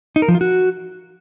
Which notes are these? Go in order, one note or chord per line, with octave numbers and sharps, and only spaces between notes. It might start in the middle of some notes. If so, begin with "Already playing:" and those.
D#4
A#4
F3
F4
F#4